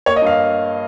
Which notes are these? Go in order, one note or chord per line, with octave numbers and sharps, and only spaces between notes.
A#3 C#5
D#5
G2 F5